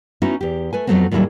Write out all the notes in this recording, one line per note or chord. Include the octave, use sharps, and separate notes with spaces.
B3 C#4 D#4 E4 F#4
E2 G4
A3 B4 G#5
F2 B2 F#3 A3 B3 C4
D#2 A2 F#3 G3 E4 G#4